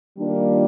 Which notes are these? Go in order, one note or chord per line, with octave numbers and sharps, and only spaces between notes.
D#3 G3 A#3 D4 F4